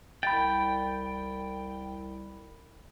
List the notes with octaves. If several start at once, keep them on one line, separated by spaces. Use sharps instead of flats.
C2 G5 B5 A6